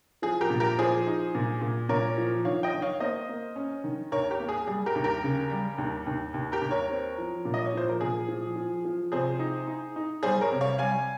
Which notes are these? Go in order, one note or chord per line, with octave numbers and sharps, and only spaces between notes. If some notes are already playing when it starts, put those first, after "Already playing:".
F3 G#4
G4 A#4
A#2
G4 A#4
F3 G#4 C5
D#4
A#2
A#2
A#2 A#4 C#5
F3
D#3 C#5 F5
D#5 G5
D#3
C#5 F5
A#3 C5 D#5
A#3
C#4
D#3
D#2 A#4 C#5
G4 A#4
A#3
G#4
G3 G#4
G4 A#4
D#2
G4 A#4
C#3
G3
D#2
D#2
D#2
G4 A#4
D#2
A#4 C#5
C4
F3
A#2
D#5
C#5
F3 C5
A#4
A#2 G#4
F3
F3
F3
C3 G#4 C5
D#4
D#4
D#4
G3 G#4 C5
A#4 C#5
C3
C#5 F5
G3 F5 G#5